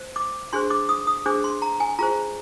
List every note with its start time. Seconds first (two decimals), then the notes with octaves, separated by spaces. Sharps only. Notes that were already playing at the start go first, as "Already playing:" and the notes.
Already playing: C5
0.16 D6
0.53 D4 G#4 C5 C6
0.70 D6
0.89 D#6
1.07 D#6
1.26 D4 G#4 C5 D6
1.44 C6
1.62 A#5
1.80 G#5
1.99 F4 G#4 C5 A#5